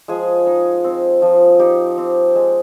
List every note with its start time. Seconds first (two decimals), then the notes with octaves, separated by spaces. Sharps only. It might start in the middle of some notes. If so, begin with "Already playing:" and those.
0.08 F3 G#3 G#4
0.47 D#4
0.84 C4
1.22 F3
1.59 D#4 G4
1.98 C4
2.35 G#3